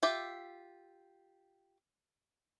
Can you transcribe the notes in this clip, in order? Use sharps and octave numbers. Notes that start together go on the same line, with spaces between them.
F4 G4 E5